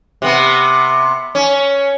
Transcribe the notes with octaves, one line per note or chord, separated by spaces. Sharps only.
C3 B3
C#4